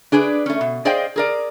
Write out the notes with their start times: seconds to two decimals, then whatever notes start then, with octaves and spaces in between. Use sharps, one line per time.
0.12 D4 G#4 B4 D5
0.46 A3 C#4
0.61 B2
0.85 G#4 C5 D5 D#5 F5 G5
1.16 G#4 A#4 D5